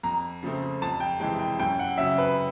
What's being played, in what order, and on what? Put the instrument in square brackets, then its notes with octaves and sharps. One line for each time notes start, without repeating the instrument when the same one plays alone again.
[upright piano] F2 [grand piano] A#5
[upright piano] C#3 F3 A3 C4
[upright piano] F2 [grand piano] A5
[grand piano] G5
[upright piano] C3 E3 G#3 [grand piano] G5
[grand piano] G5
[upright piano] F#2 [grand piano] G5
[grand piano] F#5
[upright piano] C#3 F#3 [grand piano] E5
[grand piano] B4